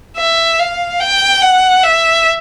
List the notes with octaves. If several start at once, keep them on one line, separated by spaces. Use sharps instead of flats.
E5
F5
G5
F#5
E5